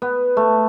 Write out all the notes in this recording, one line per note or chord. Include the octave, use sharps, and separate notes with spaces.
B3
A3